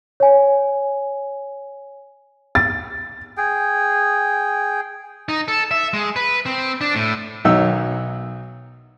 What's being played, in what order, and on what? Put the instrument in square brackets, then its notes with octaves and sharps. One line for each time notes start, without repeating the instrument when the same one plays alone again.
[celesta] C#5 G#5
[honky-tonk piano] A6
[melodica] G#4 G5
[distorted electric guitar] D#4
A4
E5
G#3
B4
C4
D4
A2
[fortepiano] B1 D#3 F#3 D#4 E5 E6